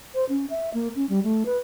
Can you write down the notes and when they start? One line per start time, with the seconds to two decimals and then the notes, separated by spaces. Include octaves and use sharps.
0.15 C5
0.29 C#4
0.50 E5
0.74 A#3
0.96 C#4
1.09 G3
1.24 A3
1.46 B4